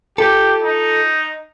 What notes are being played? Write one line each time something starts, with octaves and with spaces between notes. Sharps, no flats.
F4 G4 A4
D#4